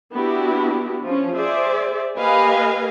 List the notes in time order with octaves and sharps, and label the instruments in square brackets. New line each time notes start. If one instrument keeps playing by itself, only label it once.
[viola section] B3 D4 E4 F#4 G4
F3 C#4
G#4 C5 D5 E5
A#3 G4 B4 D#5 F5 G#5